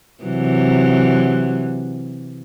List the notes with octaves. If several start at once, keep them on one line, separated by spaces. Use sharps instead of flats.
C3 E3 F#3